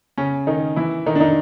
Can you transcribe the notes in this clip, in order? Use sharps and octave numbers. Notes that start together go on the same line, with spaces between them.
C#3 C#4
D#3 D#4
E3 E4
D#3 D#4
D4
D#3 D#4